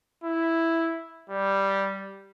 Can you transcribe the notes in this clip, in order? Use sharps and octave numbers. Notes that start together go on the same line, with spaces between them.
E4
G3